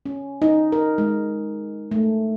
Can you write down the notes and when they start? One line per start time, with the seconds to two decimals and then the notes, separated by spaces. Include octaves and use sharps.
0.06 C#4
0.42 D#4
0.72 A#4
0.98 G#3
1.91 A3